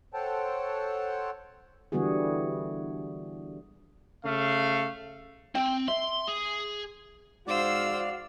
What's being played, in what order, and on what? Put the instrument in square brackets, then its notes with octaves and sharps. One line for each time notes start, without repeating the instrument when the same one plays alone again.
[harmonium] A4 C5 C#5 F#5 G5 A5
[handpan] D3 E3 G3 B3 F#4 G#4
[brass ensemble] C#3 A3 F5
[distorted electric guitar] C4 [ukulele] G5
[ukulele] E5 [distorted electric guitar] C6
[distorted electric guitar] G#4
[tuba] G#2 [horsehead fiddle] F#4 F5 [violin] C5 E6 [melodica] D5